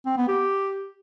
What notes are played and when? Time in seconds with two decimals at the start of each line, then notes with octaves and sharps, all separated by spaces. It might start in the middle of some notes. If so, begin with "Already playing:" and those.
0.06 C4
0.17 B3
0.28 G4